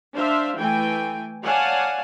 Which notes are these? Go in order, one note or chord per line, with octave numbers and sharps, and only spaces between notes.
D4 C5 E5 F5
E3 A3 G5 G#5
C#5 D5 F5 F#5 G#5 A5